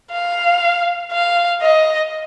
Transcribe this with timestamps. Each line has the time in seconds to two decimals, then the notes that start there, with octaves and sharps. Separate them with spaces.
0.12 F5
1.12 F5
1.62 D#5